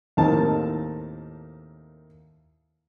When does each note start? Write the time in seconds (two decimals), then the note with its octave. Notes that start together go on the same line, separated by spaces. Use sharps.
0.17 D#2 A2 A#3 C4 D#4 A5